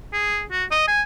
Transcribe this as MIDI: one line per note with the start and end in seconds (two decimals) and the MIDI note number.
0.13 0.42 68
0.51 0.64 66
0.71 0.85 75
0.87 1.02 80